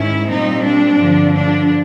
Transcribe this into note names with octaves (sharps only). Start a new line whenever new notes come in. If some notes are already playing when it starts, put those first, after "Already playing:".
Already playing: G#2 D#3 G#3 C#4 E4
A#2 G3 C4 D#4
D4
G2 D3 F3
D4